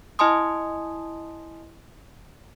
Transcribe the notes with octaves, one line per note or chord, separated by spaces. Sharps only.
E4 D#5 G#5 A5 C6 D#6